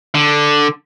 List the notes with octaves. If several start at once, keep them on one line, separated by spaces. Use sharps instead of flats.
D3